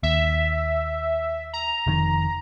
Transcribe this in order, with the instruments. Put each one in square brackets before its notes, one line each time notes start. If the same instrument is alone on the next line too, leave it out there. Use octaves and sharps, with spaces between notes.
[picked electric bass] D#2 [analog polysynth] E5
[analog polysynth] A#5
[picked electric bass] F1 D#3